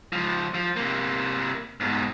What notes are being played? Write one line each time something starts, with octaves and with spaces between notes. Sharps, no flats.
C#2 F3
F3
C3 A#3
G#2 B2